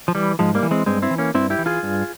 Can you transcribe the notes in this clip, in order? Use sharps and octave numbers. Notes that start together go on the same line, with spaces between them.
F3
E3 G3
G#2 F3 G#3
G3 A#3
E3
G#3 C4
G2 G#3 C4
C4 E4
E3
A#3 C#4
G2 C4 E4
E4 G4
E3
F4 G#4
G2